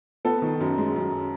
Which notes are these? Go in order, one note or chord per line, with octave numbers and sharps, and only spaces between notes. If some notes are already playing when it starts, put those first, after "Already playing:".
B3 A4
D#3
F#2
G#3
F#2